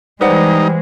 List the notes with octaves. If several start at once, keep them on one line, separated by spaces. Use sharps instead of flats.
E3 G3 G#3 D#4 B4 C5 F#5